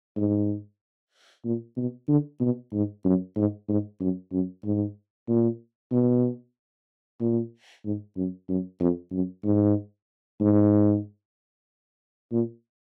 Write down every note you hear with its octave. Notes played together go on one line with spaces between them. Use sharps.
G#2
A#2
B2
D3
B2
G#2
F#2
G#2
G#2
F#2
F#2
G#2
A#2
B2
A#2
G#2
F#2
F#2
F2
F#2
G#2
G#2
A#2